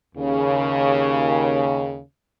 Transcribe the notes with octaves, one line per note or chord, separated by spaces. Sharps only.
D#2 C#3